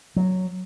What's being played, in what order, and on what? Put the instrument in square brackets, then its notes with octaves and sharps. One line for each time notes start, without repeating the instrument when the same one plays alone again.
[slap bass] F#3